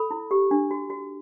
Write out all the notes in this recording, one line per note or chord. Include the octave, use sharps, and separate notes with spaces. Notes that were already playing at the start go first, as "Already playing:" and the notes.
Already playing: A4 B5
E4
G4
D4
F#4
F#4